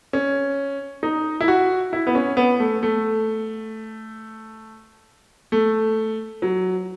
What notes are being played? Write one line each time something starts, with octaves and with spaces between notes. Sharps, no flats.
C#4
D#4
E4
F#4
E4
B3
C#4
B3
A3
A3
A3
F#3